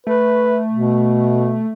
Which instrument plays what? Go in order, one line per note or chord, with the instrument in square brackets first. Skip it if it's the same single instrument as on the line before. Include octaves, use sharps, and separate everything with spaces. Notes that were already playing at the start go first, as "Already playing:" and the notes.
[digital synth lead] A3 [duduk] B4
[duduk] B2